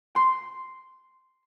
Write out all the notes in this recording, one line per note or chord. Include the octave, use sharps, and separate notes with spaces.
C6